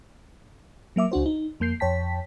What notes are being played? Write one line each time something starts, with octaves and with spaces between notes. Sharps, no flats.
F#3 A#3 E5 D6
C#2 D4 F#4 C5
D#4
F2 A#3 G6 C7
F2 C#5 G5 A5 B6